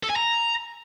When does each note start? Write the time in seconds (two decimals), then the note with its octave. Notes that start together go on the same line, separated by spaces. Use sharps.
0.03 A4
0.09 G#5
0.16 A#5